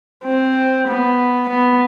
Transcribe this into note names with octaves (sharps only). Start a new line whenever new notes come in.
C4
B3
B3